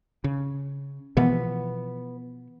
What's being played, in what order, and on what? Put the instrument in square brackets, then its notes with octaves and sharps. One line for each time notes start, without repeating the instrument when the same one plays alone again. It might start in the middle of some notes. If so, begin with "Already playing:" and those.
[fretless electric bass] C#3
[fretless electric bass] B2 E3 F3 [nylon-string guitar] B3